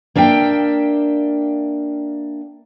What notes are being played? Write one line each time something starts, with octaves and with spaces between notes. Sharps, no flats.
A#3 D4 E5 F5 G5